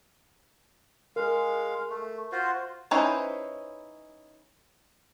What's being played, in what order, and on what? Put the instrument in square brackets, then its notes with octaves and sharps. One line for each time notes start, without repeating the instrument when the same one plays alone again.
[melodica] G#3 F5 [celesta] A#4
[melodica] A3
F4 F#4 C5
[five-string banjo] C#4 D#4 E4 B4 C5